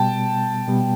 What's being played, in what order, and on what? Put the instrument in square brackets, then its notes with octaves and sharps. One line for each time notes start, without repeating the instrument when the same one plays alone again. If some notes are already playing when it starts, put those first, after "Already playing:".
Already playing: [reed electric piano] B2 G3 B3 [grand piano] G5 A5
[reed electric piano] B2 G3 B3